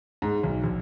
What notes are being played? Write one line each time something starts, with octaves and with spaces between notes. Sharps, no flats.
G#2
B1
A#1